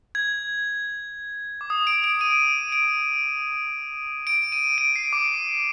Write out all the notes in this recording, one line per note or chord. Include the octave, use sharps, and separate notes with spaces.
G#6
D6
D#6
D7
D7
D#7
D7
D7
D#7
D7
C7
D6